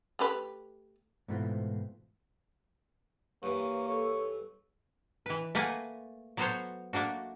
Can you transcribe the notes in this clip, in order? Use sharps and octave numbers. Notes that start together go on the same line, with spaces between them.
A3 G4 B4
G#2 B2 E3 A3 C4 F4
G2 E3 A#3 C#5
A4 C#5
E3 B4
A3 A#3 B4 F#5 G#5
F#3 B3 F#4 A4 C5 C#5
A3 A#3 D4 F#4